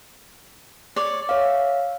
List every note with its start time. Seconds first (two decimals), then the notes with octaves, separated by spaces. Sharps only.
0.96 C#5 D5
1.29 C#5 E5 F5